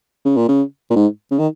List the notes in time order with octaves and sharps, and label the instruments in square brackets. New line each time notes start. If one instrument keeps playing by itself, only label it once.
[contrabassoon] C#3
A#2
C#3
A#2
G#2
C#3
D#3